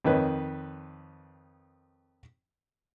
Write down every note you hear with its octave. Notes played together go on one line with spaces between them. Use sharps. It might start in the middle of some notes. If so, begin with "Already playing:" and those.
F2 D#3 B4 C#5